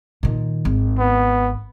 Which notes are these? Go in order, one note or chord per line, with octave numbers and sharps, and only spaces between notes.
A#2 D#3
G#1
B3